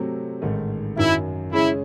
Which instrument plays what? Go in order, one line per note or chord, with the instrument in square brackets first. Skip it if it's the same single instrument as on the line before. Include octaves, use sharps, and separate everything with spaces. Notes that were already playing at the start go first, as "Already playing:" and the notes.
Already playing: [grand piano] C3 F#3 A3 C4
A1 G#2 D#3 A3
[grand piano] F#2 D#3 F#3 [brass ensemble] E4
[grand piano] C#3 G#3 C#4 G#4 [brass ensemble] E4